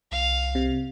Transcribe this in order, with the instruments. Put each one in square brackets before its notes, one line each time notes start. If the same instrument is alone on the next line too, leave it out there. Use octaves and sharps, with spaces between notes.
[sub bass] C2 [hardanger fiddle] F5
[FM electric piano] C3